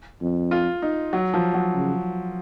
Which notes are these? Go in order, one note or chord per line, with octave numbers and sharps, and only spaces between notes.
F2
F4
D#4
F#3
F3
F#3
C#3